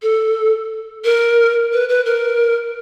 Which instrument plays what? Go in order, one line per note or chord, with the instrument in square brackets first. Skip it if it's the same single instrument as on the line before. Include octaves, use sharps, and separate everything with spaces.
[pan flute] A4
A#4
B4
B4
A#4